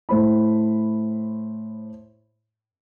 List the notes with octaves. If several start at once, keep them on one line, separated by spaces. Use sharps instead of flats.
A2 A3 C5 B5